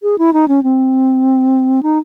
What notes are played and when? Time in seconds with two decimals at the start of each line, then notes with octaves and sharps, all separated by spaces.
0.03 G#4
0.18 E4
0.33 D#4
0.48 C#4
0.63 C4
1.83 D#4